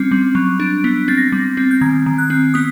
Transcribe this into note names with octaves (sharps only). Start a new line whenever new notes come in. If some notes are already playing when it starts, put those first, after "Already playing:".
Already playing: G3 C4 C#4
G3
F#3
D4
B3
C4 A6
A#6
G3 A6
C4
G6
D#3 G#6
D#3
F#6
C4
B3 D#6